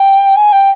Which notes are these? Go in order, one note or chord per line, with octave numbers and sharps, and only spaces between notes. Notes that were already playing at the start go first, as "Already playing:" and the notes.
Already playing: G5
G#5
G5